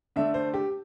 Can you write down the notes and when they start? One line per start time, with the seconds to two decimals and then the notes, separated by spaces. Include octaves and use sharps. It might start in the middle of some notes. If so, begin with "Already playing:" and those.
0.16 D3 A3 D4 E5
0.34 C5
0.54 G4